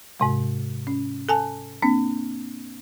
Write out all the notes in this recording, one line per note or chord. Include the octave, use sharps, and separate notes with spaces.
G#2 C3 G#3
C#4
A4 G#5 A5
A#3 C4 D4